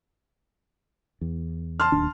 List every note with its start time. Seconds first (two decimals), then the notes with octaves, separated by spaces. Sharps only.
1.21 E2
1.80 A5 C6 F6
1.92 D1 D#2 D4